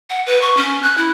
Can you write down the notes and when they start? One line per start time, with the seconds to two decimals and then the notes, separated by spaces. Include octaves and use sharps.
0.10 F#5
0.26 B4
0.41 C#6
0.57 C#4
0.83 F#6
0.98 E4